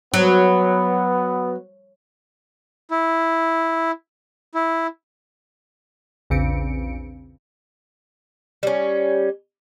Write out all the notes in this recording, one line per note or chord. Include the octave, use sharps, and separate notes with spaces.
F#3 B3
E4
E4
A#1 E2 C#3 C4 C#7 D7
G3 C#4